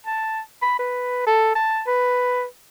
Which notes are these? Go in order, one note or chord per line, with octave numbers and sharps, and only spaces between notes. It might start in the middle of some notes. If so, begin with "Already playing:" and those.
A5
B5
B4
A4
A5
B4